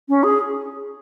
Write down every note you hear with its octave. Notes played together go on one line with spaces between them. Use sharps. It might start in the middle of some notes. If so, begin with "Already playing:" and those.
C#4
G#4